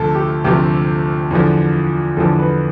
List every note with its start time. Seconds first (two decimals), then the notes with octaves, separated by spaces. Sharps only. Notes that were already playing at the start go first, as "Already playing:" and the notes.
Already playing: D2 C3 F3 A4
0.15 G4
0.44 D2 C3 F3 G4
1.31 E2 D3 F3
2.17 E2 D3 F3 A4
2.39 B4